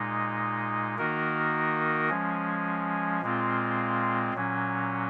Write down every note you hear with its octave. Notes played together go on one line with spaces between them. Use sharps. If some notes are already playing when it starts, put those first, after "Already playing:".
Already playing: A#2 G#3 D#4
D#3 A#3 D#4 F#4 A#4
F3 G#3 C#4
A#2 G#3 C4 F4
A#2 F#3 C#4